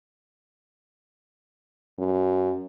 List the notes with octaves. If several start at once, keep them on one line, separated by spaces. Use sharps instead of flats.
F#2